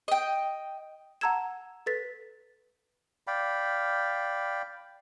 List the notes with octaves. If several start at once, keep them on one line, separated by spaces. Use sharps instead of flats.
D#5 G5
F#5 A5 A#5 E6 G#6 E7
A4 B4 A6 B6
D5 F5 G5 B5